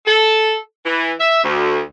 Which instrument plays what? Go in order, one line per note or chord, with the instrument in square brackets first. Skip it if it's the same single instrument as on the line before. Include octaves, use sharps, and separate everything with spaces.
[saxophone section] A4
E3
E5
D2